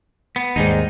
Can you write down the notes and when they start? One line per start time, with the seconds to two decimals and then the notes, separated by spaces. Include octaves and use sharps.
0.36 B3
0.56 D#2 G#2 G3 G#3 D#4